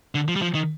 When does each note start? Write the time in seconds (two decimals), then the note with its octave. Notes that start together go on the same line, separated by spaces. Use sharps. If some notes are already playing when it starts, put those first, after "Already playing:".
0.15 D3
0.28 F3
0.36 G3
0.42 F3
0.55 D#3